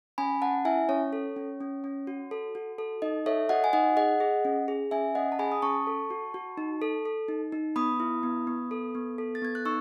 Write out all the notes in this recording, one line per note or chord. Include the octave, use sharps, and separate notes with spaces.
C#4 G#5 B5
C#4 F#5 A5
E4 E5 G#5
C#4 C#5
A4
C#4
C#4
C#4
F#4
A4
F#4
A4
D#4 D#5
A4 C#5 E5
F#4 D#5 F#5
G#5
D#4 D#5 F#5
G#4 D#5 F#5
G#4
C#4
G#4
C#4 E5 G#5
C#4 D#5 F#5
A5
G#4 G#5 B5
D#6
C#4 A5 C#6
A4
F#4
F#4
D#4
A4
A4
D#4
D#4
B3 B5 D#6
E4
B3
B3
A4
B3
A4
A6
B3 G#6
F#6
D#4 C#6 E6